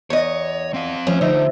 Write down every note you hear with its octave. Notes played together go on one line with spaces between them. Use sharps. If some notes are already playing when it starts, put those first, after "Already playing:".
E2 C#5 D#5
C4 F5
F3 A3 C#4
D3 D#4 E5